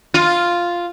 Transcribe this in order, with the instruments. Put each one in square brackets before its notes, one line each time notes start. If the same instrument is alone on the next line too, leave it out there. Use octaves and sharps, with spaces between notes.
[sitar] F4